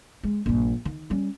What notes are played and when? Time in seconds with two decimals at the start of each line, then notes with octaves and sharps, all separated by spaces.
0.24 G#3
0.46 A#1 G2
0.85 D#3
1.10 G3 C#4